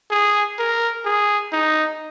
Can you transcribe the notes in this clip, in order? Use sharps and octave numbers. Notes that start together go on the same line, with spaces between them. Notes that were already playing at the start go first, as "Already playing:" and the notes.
G#4
A#4
G#4
D#4